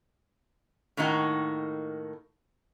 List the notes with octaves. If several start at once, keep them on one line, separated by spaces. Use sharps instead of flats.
A2 D#3 A#3 D#4 F#4